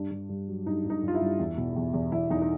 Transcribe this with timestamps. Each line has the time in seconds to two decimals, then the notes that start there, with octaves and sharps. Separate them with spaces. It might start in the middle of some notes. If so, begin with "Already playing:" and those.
Already playing: G2 D4
0.11 G2
0.29 G2
0.48 F#3
0.66 G2 D#4
0.85 G2
0.90 D#4
1.03 G2
1.08 F4
1.14 E4
1.21 G2
1.39 E2
1.57 B2
1.76 E2
1.93 E2
2.12 E2 E4
2.30 E2 D#4
2.42 D#4